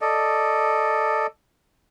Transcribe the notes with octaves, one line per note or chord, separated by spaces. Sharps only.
A4 D5 D#5